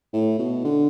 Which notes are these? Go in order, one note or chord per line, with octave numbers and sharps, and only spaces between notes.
A2
B2
D3